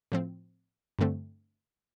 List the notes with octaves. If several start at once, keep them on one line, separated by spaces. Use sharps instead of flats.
A2 F3 C4
G2 D3 A3 C4